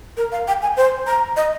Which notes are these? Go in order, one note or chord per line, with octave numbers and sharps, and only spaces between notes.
A#4
F5
G5
G#5
C5
A#5
D#5